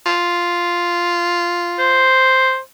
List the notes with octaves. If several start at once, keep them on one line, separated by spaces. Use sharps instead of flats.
F4
C5